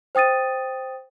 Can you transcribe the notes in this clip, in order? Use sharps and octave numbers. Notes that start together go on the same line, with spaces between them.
C5 G5 D#6 A6 D#7